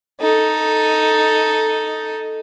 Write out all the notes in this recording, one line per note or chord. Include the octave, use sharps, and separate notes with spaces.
D#4 A4